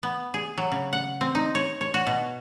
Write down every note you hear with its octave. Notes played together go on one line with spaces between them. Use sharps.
B3
G#4
F#3
C#3
F#5
C4
D#4
C#5
C#5
F#4
B2